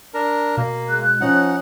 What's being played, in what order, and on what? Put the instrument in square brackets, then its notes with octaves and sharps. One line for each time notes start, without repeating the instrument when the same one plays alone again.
[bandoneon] D4 A#4
[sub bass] B2 [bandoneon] A#3
[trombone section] G#3 [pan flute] F#6
[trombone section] F3 C#4 [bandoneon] D#4 F#5